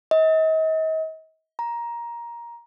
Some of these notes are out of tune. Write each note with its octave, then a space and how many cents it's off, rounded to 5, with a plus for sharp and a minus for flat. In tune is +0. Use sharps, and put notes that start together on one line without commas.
D#5 +40
A#5 +15